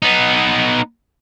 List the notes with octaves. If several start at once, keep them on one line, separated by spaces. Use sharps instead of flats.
B3 D#4